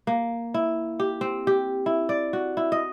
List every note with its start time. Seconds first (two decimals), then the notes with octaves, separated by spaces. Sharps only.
0.07 A#3
0.54 E4
1.00 G4
1.21 C4
1.47 G4
1.86 E4
2.09 D5
2.33 F#4
2.57 E4
2.72 D#5